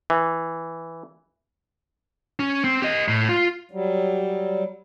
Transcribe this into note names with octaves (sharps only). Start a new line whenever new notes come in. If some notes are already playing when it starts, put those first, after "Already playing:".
E3
C#4
C4
G4 D#5
A2
F4
F#3 G3